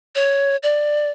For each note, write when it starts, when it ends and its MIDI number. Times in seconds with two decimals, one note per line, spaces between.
0.15 0.56 73
0.63 1.11 74